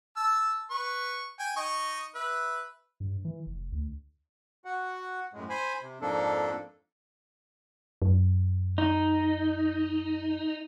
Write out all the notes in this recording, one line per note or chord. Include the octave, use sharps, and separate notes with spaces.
A5 E6
B4 C#6
G5 G#5
D#4 D#5 C#6
B4 E5
G2
E3
F1
D2
F#4 F#5
F#2 A2 G#3
C5 G#5 B5
C3
F2 G#2 F3 A#3 D4 A4
F#2
D#4